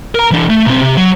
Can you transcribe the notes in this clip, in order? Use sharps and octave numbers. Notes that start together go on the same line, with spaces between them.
A#4 A#5
E3 D4
A3
B1 C4
C3
F#3